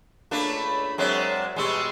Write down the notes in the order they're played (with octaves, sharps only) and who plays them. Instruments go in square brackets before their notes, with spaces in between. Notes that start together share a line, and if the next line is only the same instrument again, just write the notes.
[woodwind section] C#2 B5 [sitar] A3 A#3 D4
[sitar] F#3 G#3 C4 [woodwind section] A#4 D5 E5
[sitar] B2 G3 G#3 [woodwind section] C6 C#6 E6